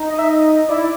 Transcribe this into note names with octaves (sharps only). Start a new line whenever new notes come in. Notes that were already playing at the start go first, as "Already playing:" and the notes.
Already playing: D#4
D#5
E5
D#5
E4 D5